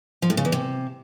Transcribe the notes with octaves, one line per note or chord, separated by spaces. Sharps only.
F3
A2
C#3
E2
C3